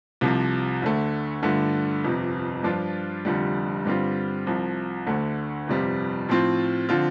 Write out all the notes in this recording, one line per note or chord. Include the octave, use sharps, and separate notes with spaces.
C2 C3 F3
D2 D3 A3
G2 D3 A3 F4
G1 F2 C3
G2 F3 D4 F4
F1 F2 D3 G3
G2 D3 G3 C4 F4
C2 C3 F3
D2 D3 A3
G1 F2 C3 G3 F4
A2 F3 C4 F4
D3 F3 C4 F4